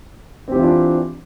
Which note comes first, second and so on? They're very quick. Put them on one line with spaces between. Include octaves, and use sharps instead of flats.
C4 G4 E3 F4 D4